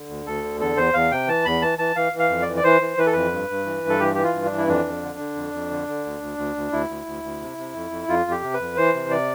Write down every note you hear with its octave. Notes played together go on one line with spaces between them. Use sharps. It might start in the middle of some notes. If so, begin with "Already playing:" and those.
Already playing: D3
D2
D2 A4
D3
E2 A4
E2 C5
E2 F5
C3 G5
E3 A5
E2 B5
E3 A5
E3 A5
E3 F5
E3
F5
F2
D5
E3
D5
E3 C5
E3
E3 B4
A4
F2 B4
G2
G2
E3
G2
A4
E3 G4
E3 G4
F4
G2
D4
E3
E4
F2 D4
F2
D3
D3
F2
F2
D3
D3
D2
D2
D2
D2
D2 E4
D2
D2
D2
C3
C3
F2
F2
F2 F4
F2 G4
C3
B4
F2
E3 C5
C3
D5